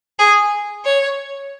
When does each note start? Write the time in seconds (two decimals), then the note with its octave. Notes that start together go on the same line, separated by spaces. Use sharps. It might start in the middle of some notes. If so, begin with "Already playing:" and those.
0.19 G#4
0.84 C#5